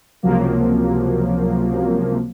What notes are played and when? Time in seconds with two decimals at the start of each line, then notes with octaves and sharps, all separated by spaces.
0.23 C#2 C3 F3 F#3 A#3